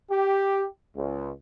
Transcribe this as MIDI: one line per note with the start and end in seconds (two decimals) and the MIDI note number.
0.11 0.66 67
0.97 1.31 37